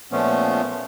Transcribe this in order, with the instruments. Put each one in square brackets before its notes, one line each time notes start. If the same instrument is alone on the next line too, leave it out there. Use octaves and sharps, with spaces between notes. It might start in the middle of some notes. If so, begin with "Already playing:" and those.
[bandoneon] A#2 F3 A3 B3 C#4